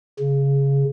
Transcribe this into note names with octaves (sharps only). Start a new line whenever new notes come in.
C#3